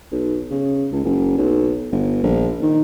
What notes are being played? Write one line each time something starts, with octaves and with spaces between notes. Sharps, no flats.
B1
C#3
C#2
F#1
B1
G1
A#1
D#3